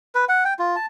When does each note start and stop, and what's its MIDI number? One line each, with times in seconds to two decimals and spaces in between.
0.15 0.25 71
0.29 0.44 78
0.45 0.54 79
0.59 0.76 65
0.76 0.86 81